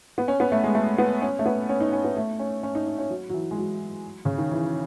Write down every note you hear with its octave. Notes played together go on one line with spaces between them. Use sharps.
B3
C#4
B3
A3
G#3
A3
B3
C#4
A3
B3
C#4
D#4
C#4
B3
A3
C#4
C#4
D#4
D#4
C#4
F#3
F#3
E3
G#3
F#3
C#3
D#3
E3